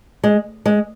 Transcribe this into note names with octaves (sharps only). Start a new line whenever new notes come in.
G#3
G#3